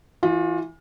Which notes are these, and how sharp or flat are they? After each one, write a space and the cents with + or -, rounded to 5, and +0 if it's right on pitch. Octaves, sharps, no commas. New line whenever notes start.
E3 +0 F4 +35